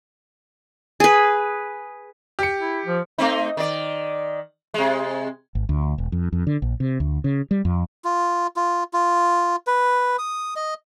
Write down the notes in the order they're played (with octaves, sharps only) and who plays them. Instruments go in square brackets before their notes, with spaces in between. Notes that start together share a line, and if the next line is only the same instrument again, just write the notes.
[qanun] G#4 B4
[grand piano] G4 C#7
[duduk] E4
F3
[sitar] A3 C4 D#4
D#3 D5
C3 G#3
[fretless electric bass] G#1
D2
E1
F2
F2
D3
A#1
C3
D2
C#3
G3
F2
[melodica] F4
F4
F4
B4
D#6
D#5